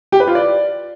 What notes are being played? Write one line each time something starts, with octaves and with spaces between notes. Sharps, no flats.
G4
B4
F4
D5